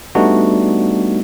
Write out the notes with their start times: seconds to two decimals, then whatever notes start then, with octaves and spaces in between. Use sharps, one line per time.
0.15 G3 A3 B3 D4 D#4 F#4